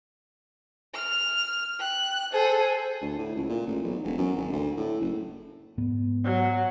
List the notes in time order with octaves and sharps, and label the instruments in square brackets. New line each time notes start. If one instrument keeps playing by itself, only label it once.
[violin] F6
[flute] G5 [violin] F#6
[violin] G#4 A4 [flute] C5
[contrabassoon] D2
A2
C#2
A#2
A1
B1
E1
F#2
G#1
D2
A2
F#1
[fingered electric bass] G#2 B3
[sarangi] F#3